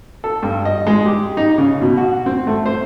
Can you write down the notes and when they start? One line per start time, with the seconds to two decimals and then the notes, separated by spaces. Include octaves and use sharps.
0.24 A4
0.43 G2
0.65 D#5
0.87 G#3
1.06 G4
1.37 D#4
1.58 C#3
1.82 B2
1.98 F#4
2.26 C4
2.47 A3
2.66 C5